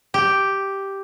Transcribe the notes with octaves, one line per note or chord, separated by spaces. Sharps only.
G4